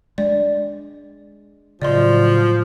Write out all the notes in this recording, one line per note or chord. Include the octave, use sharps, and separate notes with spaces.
G#3 D4 D5
A2 C#3 F3 F#3 D5 D#5 C6